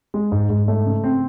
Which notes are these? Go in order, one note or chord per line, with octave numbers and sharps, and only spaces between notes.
G#3
G#2
G#2
A3
C#3
C4